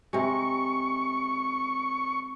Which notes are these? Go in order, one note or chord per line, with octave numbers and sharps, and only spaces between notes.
C3 G#3 C#6